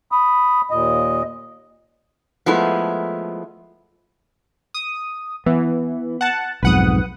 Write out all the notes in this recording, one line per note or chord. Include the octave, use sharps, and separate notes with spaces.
B5 D#6
D#2 A#2 D#5
F3 G#3 A3 B3 E4
D#6
E3 B3
F#5 A5
B1 F2 G#2 B4 F#5 D#6